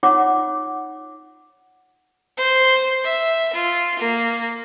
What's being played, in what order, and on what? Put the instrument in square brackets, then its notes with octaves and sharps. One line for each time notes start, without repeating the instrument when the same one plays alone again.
[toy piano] D#4 F4 C#5 F#5 D6
[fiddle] C5
E5
F4
A#3